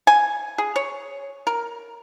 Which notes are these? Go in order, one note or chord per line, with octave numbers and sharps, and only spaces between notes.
G#5
G#4
C#5
A#4